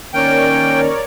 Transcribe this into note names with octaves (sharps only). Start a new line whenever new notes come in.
D#3 A#3 C#4 A#4 C#5 D5 G5